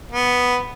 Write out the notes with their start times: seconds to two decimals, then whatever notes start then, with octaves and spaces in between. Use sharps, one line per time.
0.12 B3